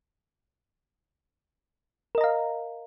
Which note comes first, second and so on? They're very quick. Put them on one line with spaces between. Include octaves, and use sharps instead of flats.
A#4 D#5 A#5 F5